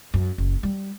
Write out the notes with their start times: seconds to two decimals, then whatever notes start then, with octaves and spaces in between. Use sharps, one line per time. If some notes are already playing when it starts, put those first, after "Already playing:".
0.14 F#2
0.38 F#1
0.63 G3